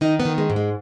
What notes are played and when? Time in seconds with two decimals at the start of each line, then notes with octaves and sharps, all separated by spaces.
0.01 D#3 D#4
0.20 B3
0.25 D#3
0.38 G#3
0.50 G#2
0.56 G#3